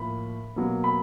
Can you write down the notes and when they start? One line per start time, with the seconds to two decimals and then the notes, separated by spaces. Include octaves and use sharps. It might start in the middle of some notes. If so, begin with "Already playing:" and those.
Already playing: A2 F3 A#3 B5
0.56 B2 F#3 A#3
0.84 B5